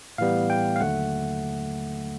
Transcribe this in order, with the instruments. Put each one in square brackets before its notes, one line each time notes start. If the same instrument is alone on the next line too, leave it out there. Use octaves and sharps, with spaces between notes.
[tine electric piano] A2 E3 G3 B3 F5
G5
F5
D#2 D3 F#3 A3 F#5